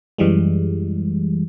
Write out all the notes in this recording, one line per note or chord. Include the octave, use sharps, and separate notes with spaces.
F#2 E3 G3 G#3